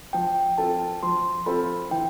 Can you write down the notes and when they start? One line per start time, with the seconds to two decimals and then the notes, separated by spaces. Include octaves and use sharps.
0.13 F3 G5
0.58 C4 F4 A4 A5
1.03 F3 C6
1.46 C4 F4 A4 B5
1.91 E3 G5